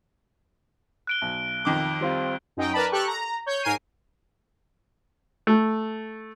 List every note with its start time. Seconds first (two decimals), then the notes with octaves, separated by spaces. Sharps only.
1.07 F#6 D7 G7
1.22 B1
1.65 F2 D#3 D6
2.01 G3 C4 F4
2.57 F#2 D#4 D#5 G5
2.72 A#4 B4 D5 A5 B5
2.92 G4 A4 C#6 F#6
3.07 A#5
3.46 C#5 G6
3.63 G#2 A#4 G#5 C7 D#7
5.47 A3